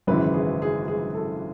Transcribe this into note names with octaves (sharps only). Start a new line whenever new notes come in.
G#1 F#2 C#3 E3 B4
G#4
G#4
G#4
A4